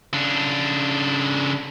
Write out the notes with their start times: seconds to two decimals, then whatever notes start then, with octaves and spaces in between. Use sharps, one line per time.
0.13 C#3 D4